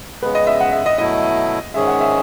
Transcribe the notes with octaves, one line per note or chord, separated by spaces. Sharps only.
C#3 G#3 B3 B4
D#5
E5
F#5
E5
D#5
B2 F#3 A3 E4 D#5
G#2 D#3 G#3 C#4 G#4 E5
F#5
E5